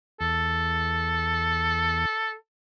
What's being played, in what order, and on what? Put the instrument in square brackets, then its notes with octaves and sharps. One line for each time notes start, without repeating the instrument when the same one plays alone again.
[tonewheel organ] E2 [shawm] A4